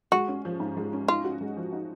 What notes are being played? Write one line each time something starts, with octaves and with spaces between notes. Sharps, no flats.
G#3 F#4
C#4
F3
G#2
G#3
C#4
D#4 F4
F#4
G#3
F3
D#4